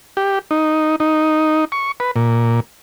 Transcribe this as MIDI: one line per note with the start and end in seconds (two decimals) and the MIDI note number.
0.17 0.39 67
0.51 0.96 63
1.00 1.65 63
1.72 1.92 85
2.00 2.11 71
2.16 2.60 46